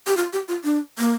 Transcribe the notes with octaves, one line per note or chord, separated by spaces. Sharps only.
G4
F4
G4
F4
D4
A#3